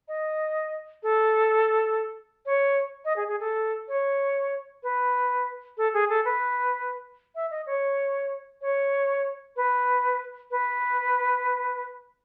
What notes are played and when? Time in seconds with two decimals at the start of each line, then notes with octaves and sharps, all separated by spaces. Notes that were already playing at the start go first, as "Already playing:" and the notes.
0.08 D#5
1.03 A4
2.46 C#5
3.05 D#5
3.16 G#4
3.28 G#4
3.40 A4
3.88 C#5
4.83 B4
5.77 A4
5.94 G#4
6.09 A4
6.25 B4
7.35 E5
7.51 D#5
7.67 C#5
8.61 C#5
9.56 B4
10.51 B4